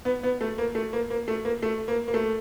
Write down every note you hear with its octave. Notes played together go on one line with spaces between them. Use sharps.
B3
B3
A3
A#3
A3
A#3
A#3
A3
A#3
A3
A#3
A#3
A3